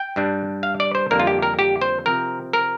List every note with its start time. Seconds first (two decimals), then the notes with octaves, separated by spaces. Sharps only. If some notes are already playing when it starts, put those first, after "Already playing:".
Already playing: G5
0.16 G2 G3 D4
0.63 F5
0.80 D5
0.95 C5
1.11 F2 D3 G3 A#3 D4 A#4
1.19 F4
1.27 G4
1.42 A#4
1.59 G4
1.81 C5
2.06 C3 F3 C4 A#4
2.53 A#4